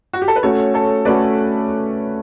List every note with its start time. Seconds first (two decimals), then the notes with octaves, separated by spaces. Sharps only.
0.13 F#4
0.22 G4
0.28 A4
0.36 B4
0.43 A3 C#4 F#4 A4 C#5
0.74 A4 C#5
1.05 A3 C#4 F#4 B4 D5